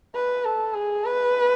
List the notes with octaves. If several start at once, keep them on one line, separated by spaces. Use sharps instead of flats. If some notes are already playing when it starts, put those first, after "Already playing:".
B4
A4
G#4
B4